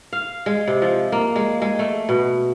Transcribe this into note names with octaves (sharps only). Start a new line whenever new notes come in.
F5
G#3
C3
F3
A#3
G#3
G#3
A3
B2